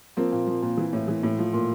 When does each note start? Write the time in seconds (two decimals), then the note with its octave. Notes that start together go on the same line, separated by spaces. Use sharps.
0.17 F3 A#3 C4
0.32 A#2
0.47 F3
0.62 A#2
0.77 E3
0.93 A2
1.08 E3
1.23 A2
1.38 F3
1.53 A#2